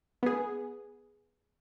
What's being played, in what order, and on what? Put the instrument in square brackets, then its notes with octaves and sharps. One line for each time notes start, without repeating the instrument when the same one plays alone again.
[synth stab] B3 G#4